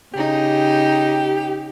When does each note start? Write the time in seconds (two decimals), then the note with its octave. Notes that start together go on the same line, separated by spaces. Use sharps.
0.14 C#3 D#4 G4